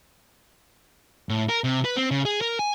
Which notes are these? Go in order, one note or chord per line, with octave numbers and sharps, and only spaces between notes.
A2
A#4
C3
B4
C4
C#3
G#4
A#4
G#5